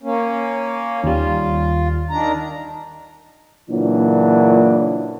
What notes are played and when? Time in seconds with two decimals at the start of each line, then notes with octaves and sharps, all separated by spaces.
0.03 A#3 C#4
1.04 D#2 G3 F4
2.11 D#3 D4 A#5
3.70 A#2 C#3 E3 F#3 D4